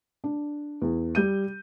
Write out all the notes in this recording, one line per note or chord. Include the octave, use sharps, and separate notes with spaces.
D4
E2
G3 G6 D#7